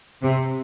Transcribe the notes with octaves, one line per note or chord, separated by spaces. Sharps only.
C3